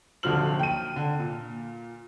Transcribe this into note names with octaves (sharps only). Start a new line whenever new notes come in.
D#1 D3 F3 F#3 F6 F#7
G5 D#7
D3
A#2